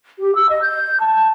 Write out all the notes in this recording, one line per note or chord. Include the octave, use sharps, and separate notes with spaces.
G4
E6
D#5
G6
A5